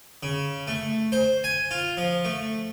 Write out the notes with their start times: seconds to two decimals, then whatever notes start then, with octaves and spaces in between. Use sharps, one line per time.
0.23 C#3
0.67 A3
1.12 C5
1.44 G#5
1.71 F4
1.97 F3
2.25 A3